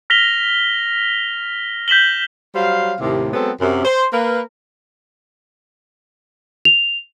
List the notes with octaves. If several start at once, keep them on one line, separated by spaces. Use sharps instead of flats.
F6 A#6 B6 F7 G7
G6 B6 E7 F#7 G7
F#3 G3 C5 F5
D#2 A2 C3
F#3 G#3 B3 C4 A4 C5
F#2 C3
C5
A#3 A#4 B4
F7